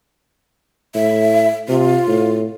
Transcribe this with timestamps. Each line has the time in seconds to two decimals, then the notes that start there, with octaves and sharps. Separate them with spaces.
0.95 A2 E5
1.68 C3 F4
2.07 A2